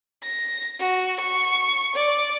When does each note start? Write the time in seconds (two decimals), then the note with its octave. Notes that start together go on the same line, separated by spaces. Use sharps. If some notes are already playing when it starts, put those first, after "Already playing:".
0.23 A#6
0.79 F#4
1.20 C#6
1.94 D5